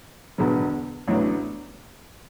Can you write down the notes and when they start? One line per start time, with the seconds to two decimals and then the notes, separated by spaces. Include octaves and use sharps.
0.38 E1 E2 D3 F#3 B3
1.08 A1 A2 F#3 B3 D4